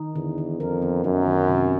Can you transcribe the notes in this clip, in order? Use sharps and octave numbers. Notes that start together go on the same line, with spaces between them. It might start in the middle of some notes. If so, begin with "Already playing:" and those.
Already playing: D#3 D#4
E2 D3
D3
F2 A#4
B3
F#2 D#4
D#3
C3